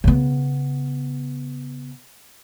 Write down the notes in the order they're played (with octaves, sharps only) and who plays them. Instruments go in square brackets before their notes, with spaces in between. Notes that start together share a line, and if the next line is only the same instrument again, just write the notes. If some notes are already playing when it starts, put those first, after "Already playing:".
[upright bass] C#3 B3